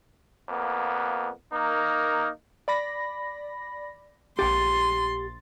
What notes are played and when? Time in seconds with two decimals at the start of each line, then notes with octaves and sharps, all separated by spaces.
0.49 F2 A#3 B3
1.51 A#3 D#4 A#4
2.68 D5 B5 A#6
4.39 A#1 G4 F#5 G5 C6 A6